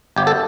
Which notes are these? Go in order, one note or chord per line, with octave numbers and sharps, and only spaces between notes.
G1 G4
A4